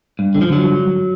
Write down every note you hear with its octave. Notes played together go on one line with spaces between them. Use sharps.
G2
D3
F3
D3 F#3
G2
G2